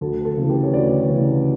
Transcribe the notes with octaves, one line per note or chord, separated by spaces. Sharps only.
D2 A4
A4
C#3 E3
G4 B4
C#5
D2 B4 D5
C#3 E3